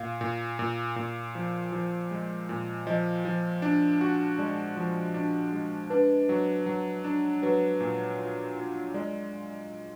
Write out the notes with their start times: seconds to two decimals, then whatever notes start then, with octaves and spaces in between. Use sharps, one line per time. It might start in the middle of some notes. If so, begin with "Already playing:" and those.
Already playing: A#2 F5
0.21 A#2
0.59 A#2
0.96 A#2
1.35 F3
1.72 F3
2.11 G#3
2.49 A#2
2.87 F3 D#5
3.25 F3
3.62 D4
4.01 F#4
4.38 G#3 D5
4.77 F3
5.14 D4
5.53 G#3
5.90 D4 B4
6.29 F#3
6.66 F#3
7.04 D4
7.42 F#3 B4
7.80 A#2
8.19 F4
8.57 F4
8.94 G#3 D5